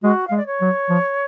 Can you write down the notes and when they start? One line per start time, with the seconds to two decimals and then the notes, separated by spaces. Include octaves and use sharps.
0.03 G#3 F#4
0.27 G#3 F5
0.37 D5
0.46 C#5
0.61 F#3
0.89 F3